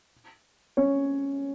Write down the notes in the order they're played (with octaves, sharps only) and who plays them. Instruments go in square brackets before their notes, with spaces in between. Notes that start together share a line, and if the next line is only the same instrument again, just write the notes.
[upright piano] C#4 C#5